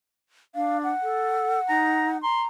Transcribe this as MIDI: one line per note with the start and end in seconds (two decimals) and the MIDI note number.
0.55 0.90 62
0.55 0.78 77
0.84 2.18 78
1.03 1.60 69
1.69 2.19 63
1.69 2.08 82
2.23 2.48 82
2.23 2.43 84